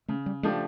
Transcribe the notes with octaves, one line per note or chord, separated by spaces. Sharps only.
C#3 A3
G3
F3 G#3 A3 D4 G4